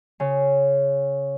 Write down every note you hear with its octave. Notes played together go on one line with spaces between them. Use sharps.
C#3